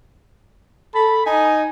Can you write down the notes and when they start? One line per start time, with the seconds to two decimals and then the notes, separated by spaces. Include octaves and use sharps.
0.94 A4 B5
1.26 D#4 G#5